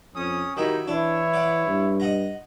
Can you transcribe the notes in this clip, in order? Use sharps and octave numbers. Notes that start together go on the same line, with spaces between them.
F2 C#4 D#6
D#3 F#3 D#4 E4 G4
E3 D4 E4 C#5
D5 F#5
G2
D#5 F#5 A#5